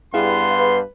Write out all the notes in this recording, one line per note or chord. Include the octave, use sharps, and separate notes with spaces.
G2 G3 B3 E4 G#4 F5 C6
B4